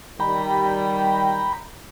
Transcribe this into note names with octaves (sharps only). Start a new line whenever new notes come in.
D#3 G3 G5 A#5 B5